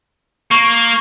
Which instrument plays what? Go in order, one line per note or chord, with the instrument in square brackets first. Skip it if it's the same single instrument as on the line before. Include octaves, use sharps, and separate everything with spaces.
[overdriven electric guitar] A#3 [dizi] C#6